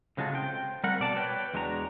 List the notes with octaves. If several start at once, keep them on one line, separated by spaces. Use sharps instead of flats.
A2 C#3 F#3 G#3 F4 A4
C4 G5
G3 A3 A#4 F#5
B2 D5 A5
B4 C#5 G5
E2 G#3 D4 F#4 A#5